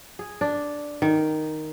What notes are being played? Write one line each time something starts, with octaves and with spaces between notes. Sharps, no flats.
G#4
D4
D#3